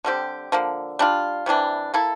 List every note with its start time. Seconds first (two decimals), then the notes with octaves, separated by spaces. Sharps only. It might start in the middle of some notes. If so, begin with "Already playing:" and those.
0.04 D3 G3 C4 G4
0.52 D3 F3 A#3
0.99 G3 D4 F4
1.46 C3 E3 G3 D4
1.94 A#3 E4 A4